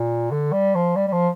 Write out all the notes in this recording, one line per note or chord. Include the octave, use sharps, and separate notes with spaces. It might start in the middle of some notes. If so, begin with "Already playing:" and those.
Already playing: A#2
D3
G3
F3
G3
G3
F3